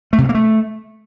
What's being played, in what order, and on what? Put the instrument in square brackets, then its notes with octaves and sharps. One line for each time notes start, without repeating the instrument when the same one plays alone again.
[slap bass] A3
C3
G2
A#3
A3